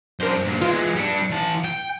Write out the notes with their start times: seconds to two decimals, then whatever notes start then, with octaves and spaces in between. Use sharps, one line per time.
0.20 F#2 D4 A#4 C5
0.43 G2 A#2
0.61 E3 G#3 F4
0.96 G3 D4 C#7
1.30 E3 A5
1.64 G5